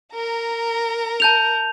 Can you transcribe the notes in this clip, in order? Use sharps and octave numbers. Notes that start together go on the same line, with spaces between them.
A#4 A#5
A5 G6 F7